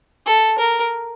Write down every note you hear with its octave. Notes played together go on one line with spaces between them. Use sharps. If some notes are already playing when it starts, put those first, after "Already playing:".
A4
A#4